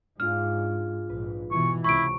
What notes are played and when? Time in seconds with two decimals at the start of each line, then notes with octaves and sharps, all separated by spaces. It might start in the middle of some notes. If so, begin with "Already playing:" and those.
0.20 G#2 D4 F4 G#4 F6
1.09 A#1 G#2 B4
1.52 B2 E3 D#5 G#5 C#6
1.84 C#2 C3 E4 A#5 C#6 D7